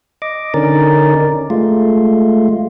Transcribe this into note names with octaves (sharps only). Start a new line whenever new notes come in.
D#5 D6
D3 C#4 D#4 A#4 D5
G#3 A3 F4